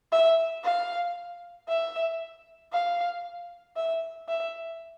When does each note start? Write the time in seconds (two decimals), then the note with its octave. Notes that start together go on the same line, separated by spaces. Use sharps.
0.12 E5
0.64 F5
1.68 E5
2.72 F5
3.76 E5
4.28 E5